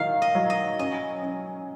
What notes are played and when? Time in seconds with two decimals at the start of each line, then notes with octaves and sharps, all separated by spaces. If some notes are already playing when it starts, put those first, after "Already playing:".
Already playing: D#3 F#3 F5
0.22 D#5
0.35 F#3
0.50 D#5
0.79 C#4 D#5
1.23 C#4